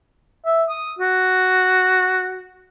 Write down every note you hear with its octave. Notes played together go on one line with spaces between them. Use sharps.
E5
D#6
F#4